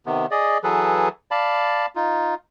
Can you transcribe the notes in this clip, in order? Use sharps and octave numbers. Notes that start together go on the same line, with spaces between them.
C3 D#3 B3
G#4 D5 D#5
E3 F#3 G#4 A4 B4
D5 F5 A5 B5
D#4 F4